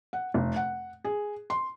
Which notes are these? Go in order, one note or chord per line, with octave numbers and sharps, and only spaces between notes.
F#5
F1
F#5
G#4
C6